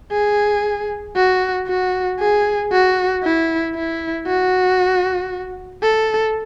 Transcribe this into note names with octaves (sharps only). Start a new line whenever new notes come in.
G#4
F#4
F#4
G#4
F#4
E4
E4
F#4
A4